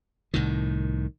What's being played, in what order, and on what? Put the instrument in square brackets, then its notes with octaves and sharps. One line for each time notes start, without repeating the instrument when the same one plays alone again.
[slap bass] C2 A2 D#3